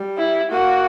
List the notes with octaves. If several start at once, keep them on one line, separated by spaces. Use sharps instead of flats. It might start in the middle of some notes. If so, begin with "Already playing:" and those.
Already playing: G3
E4
A#3 F#4